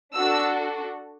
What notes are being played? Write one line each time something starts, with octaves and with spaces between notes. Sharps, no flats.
D4 F#4 A4 E6